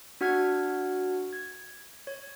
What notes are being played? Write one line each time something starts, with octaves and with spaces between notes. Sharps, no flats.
D4 F#4 F#5 F6 G#6
G#6
C#5